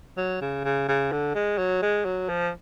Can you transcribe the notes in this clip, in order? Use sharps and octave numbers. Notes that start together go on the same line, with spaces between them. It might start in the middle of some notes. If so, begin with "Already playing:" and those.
F#3
C#3
C#3
C#3
D3
G#3
F#3
G#3
F#3
F3